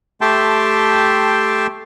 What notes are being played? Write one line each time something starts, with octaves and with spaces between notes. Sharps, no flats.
A3 G4 E5 G5 A5 C6